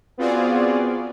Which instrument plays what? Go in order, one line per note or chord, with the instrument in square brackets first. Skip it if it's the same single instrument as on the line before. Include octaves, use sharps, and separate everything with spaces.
[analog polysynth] B3 C4 F4 F#4 G#4 D5